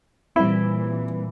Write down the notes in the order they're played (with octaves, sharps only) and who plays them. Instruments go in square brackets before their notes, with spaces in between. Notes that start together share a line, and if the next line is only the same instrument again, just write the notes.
[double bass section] A#2 E3 [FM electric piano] G3 C4 [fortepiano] E4